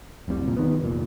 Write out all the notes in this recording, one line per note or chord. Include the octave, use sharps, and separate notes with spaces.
F1 C2 C3 G3
C2 A#2
D#3 B3
F1 A#2